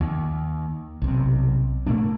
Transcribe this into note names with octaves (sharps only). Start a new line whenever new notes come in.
D#2
B1 C3
A#2 A3 A#3 D4